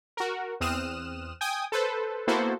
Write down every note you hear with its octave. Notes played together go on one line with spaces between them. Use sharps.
F#4 A#4
E2 C4 D#6 F6 F#6 E7
G5 G#5 D#6
A4 B4 C5
A#3 B3 E4 F#4 A4 C5